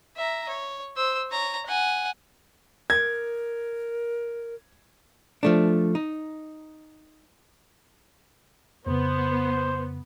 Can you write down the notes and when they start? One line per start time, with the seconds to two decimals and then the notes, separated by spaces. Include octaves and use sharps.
0.17 E5 A#5
0.49 C#5
0.96 C5 E6
1.31 C#5 A#5
1.66 F#5 G#5
2.90 A#4 G#6
5.43 F3 A3 D4
5.95 D#4
8.86 F2 C#3 B3 C5